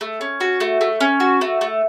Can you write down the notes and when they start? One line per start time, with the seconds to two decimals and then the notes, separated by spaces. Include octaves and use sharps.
0.01 A3
0.21 C#4
0.40 F#4
0.60 A3
0.81 A3
1.00 C#4
1.20 F#4
1.41 A3
1.61 A3